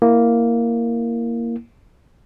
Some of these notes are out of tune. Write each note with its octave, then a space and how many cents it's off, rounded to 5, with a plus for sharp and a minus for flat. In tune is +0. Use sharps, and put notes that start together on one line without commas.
A#3 +0 E4 +0